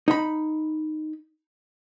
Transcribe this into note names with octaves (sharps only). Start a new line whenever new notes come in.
D#4 B5